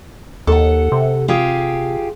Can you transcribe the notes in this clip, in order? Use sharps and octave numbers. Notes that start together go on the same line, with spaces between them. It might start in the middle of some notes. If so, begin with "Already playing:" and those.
D#2 A4 F#5
C3
F4 G4 G#4